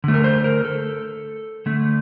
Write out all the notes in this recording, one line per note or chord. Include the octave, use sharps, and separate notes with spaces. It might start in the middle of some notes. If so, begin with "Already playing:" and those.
D3 A3
A#4
C5
A#4
A4
D3 A3